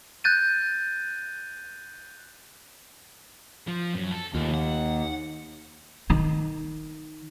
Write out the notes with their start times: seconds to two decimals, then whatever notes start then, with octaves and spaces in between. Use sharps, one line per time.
0.24 F#6 G6 A6 D#7
3.67 F3
3.94 F#2
4.11 A4
4.35 D#2 A3 F4
4.54 F#5
6.10 D#3 D#4